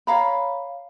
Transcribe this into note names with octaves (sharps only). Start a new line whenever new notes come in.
C#5 F5 A#5 B5